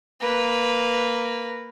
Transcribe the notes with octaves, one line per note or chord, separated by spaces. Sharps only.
A#3 B4